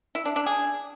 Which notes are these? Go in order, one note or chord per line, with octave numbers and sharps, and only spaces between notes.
E4
D4
D4
G#4